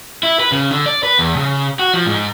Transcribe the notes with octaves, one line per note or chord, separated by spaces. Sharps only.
E4
B4
C#3
D3
D5
B4
E2
C#3
F#4
F3
G#2